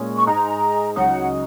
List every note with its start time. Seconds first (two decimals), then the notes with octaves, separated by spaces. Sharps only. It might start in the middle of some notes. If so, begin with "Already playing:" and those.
Already playing: A#2 G#3 C#4
0.15 C#6
0.27 G#2 G#3 D#4 A#5
0.96 C#2 C#3 F#3 D#4 F#5